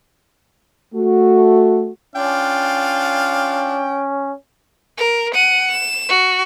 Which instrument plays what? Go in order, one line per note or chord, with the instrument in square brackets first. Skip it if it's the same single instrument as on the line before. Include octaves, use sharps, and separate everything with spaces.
[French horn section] A3 F#4
[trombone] C#4 [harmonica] D4 F4 F5 [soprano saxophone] G5
[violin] A#4
F#5 D#7
E7
F#4